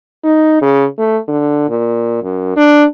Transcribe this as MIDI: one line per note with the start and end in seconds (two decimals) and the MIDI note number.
0.24 0.57 63
0.62 0.85 49
0.99 1.18 57
1.28 1.67 50
1.69 2.20 46
2.23 2.53 42
2.56 2.84 62